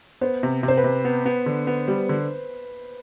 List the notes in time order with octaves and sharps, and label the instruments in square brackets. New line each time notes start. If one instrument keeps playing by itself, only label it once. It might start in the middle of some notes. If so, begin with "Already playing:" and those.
[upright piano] B3 [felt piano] C5
[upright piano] C3
C3
[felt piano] C5
B4
[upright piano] C3
B3
B3
D3
B3
G3
D3